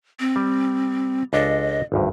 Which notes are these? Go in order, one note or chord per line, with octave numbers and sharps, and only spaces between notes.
C4
G3
C#2 D4 A4 D#5
G#1 D2 G2